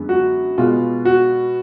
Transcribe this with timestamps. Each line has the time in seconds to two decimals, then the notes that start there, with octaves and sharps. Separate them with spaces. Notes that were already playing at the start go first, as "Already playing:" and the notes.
Already playing: F#2 D3 G#3 B3
0.09 F#4
0.58 B2 G#3 B3 F4
1.05 F#4